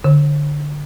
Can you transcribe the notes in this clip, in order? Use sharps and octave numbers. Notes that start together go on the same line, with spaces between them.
D3